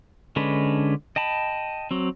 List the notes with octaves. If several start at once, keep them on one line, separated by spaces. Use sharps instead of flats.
D3 G#3 C#4 D4 B4
D#5 G5 A5 B5
F#3 C4